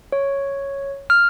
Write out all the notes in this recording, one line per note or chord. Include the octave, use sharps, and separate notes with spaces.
C#5
F6